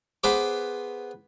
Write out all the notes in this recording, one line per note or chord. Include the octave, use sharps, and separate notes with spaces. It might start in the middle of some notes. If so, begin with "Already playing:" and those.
B3 G#4 B4 C5 D6